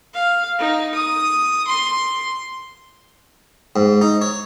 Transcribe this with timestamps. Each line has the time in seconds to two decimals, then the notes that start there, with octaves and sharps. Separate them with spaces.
0.14 F5
0.59 D#4
0.94 D#6
1.67 C6
3.76 G#2
4.01 D#4
4.21 C#5